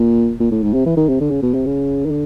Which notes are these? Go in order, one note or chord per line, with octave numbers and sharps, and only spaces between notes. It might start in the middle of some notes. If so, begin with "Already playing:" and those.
Already playing: A#2
A#2
A2
G#2
C3
E3
D#3
C3
D3
C#3
B2
C3
C#3
D#3
D3